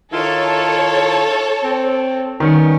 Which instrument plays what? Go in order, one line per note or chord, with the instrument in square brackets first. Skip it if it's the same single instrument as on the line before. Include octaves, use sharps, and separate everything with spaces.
[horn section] D#3 E4 F4 [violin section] A4 C#5
[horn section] C4
[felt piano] D#3 [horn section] G3 B3 C#4